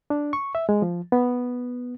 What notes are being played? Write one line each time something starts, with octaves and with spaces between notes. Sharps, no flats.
D4
C#6
E5
G#3
F3
B3